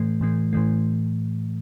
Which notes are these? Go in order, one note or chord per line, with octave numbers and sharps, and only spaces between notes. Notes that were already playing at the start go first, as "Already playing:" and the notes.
Already playing: A2 E3 A3
A2 E3 A3
A2 E3 A3